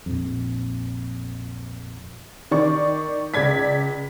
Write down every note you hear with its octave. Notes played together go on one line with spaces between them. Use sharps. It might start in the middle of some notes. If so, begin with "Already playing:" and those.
A#1 F2
D#3 D5 C#6
C#2 D5 G#6 B6